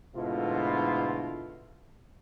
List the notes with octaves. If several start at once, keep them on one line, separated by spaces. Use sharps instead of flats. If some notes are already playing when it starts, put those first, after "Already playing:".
G#2 B2 D3 A3 E4 F4